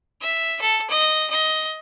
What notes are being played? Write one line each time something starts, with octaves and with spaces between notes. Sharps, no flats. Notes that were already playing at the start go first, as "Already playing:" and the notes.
E5
A4
D#5
D#5